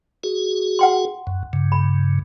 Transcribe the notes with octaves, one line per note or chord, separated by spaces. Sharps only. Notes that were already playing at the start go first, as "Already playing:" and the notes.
F#4 G#4
F#5 G5 C6
F#2
G2 C#3
B5